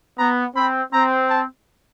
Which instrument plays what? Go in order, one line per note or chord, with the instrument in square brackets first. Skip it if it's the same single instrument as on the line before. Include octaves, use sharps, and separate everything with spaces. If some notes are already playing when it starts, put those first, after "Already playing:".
[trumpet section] B3 [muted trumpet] A#5
[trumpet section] C4 [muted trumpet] B5
[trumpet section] C4 [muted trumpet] A#5
[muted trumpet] A5